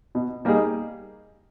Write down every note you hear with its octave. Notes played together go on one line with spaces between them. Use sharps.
B2
G3 A#3 D#4 G#4